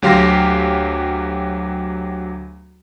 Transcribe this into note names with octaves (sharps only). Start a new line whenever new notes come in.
D2 F#3 G4 F5 C6 A#6